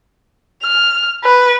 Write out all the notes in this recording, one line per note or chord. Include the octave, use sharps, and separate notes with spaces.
F6
B4